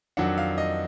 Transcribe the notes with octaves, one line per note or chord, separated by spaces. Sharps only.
F2 D#3 F#3 D4 F#5
F5
D#5